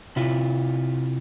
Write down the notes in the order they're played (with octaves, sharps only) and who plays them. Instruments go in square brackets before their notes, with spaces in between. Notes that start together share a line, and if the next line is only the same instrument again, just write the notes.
[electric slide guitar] C3 E4 F4